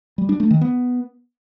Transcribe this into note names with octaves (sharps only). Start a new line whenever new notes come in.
G3
D4
A3
D#3
B3